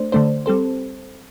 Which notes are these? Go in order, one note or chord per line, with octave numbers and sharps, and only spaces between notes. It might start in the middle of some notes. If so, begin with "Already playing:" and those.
Already playing: A3 D4 C5
D3 A3 D4 C5
G3 C4 A4 C5